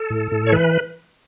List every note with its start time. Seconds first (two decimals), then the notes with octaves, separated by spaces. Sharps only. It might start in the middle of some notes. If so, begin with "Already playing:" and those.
Already playing: A4
0.10 A2
0.32 A2
0.47 C#5
0.52 E3 B4